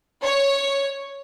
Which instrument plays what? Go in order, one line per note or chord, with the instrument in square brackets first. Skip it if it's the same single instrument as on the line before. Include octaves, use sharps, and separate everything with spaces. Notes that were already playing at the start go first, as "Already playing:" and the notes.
[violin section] C#5